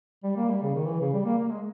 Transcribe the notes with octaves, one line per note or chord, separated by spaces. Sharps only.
G3
A#3
G3
C#3
D#3
E3
C#3
G3
A#3
A#3
G#3